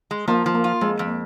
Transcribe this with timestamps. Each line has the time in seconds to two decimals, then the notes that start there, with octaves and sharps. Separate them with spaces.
0.11 G#3
0.28 F3 A#3
0.46 F3
0.55 A#3
0.64 F4
0.81 F2 G#3
0.99 F2
1.08 A#3